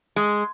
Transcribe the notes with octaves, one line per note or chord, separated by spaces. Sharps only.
G#3